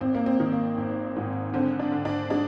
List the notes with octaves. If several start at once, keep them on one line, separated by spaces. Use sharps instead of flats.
G#1 C4
A#3
C4
D#3
A#3
G#1
G#2
D3 C4
D4
D3
D4
G#3 D4